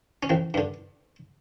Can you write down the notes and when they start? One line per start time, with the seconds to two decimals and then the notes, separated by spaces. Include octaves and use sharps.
0.23 C#4
0.29 A1 C4
0.54 G2 D3